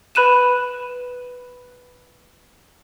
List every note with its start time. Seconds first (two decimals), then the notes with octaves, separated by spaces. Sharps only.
0.15 B4 B5 F#6 D#7 E7